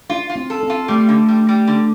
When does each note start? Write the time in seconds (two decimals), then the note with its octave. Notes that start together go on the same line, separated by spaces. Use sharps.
0.10 D4 F4
0.30 F4
0.36 C4
0.50 A4
0.63 C4
0.70 F4
0.88 G3 A3
1.09 D3
1.28 G3
1.49 G3
1.67 D3